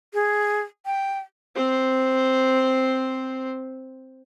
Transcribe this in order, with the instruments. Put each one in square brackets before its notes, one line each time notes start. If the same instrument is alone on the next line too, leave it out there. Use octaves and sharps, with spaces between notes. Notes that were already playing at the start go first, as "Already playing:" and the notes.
[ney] G#4
G5
[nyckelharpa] C4 C5